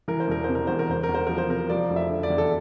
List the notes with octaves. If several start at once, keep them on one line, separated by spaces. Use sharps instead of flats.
E3 A#4
C5
E1 A#4
C3 C5
A#4
E2 C5
A#4
E2 C5
A#4
E2
C5
F3 A#4
C5
C3 A#4
F3 D5
F1
E5
D3
D5
E2
A4